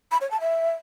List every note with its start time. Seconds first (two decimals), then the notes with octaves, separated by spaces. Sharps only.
0.11 B5
0.21 C#5
0.31 A5
0.40 E5